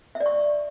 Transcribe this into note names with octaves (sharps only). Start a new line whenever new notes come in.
E5
D5
C#6